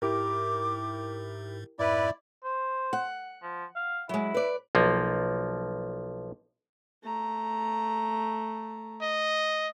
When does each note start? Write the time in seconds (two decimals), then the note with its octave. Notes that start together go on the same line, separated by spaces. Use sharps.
0.02 G#2 E4 G4 A#4 D6
1.79 F2 G#2 E4 B4 D5
2.44 C5
2.93 F#5
3.43 F3
3.76 F5
4.09 F#3 G#3 E4
4.34 B4 D5
4.75 B1 F3 A#3
7.03 A3 A#5
9.02 D#5